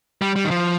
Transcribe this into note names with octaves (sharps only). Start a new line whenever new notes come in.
G3
G3
D#3
F3